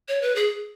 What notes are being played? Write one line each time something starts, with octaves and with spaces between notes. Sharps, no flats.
C#5
B4
G#4